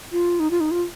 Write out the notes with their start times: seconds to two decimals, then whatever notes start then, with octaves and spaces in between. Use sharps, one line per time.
0.12 F4
0.40 D#4
0.51 F4
0.60 D#4
0.71 F4